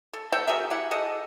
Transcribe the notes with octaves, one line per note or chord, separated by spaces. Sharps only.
A4
E5 F#5 G5 A5
F#4 G#4 A#4 E5
E4 G4 F#5
G#4 A4 D#5 F#5